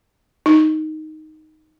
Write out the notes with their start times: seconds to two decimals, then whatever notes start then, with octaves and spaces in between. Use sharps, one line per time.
0.46 D#4